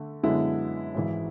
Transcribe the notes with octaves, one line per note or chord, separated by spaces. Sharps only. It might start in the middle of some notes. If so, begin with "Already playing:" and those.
Already playing: D3 A3
F#2 D3 G#3 B3 E4
G#1 G#2 E3